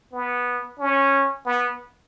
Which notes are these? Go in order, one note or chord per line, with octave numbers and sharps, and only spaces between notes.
B3
C#4
B3